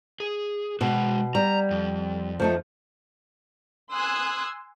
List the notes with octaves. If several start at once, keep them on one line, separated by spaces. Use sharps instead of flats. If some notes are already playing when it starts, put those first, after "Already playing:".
G#4
B2 G#3 F#4
G3 A#5
F2
F3 A3 D#4
G#5 C6 D#6 E6 F#6 G#6